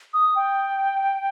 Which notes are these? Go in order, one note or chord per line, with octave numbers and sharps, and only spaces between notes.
D#6
G5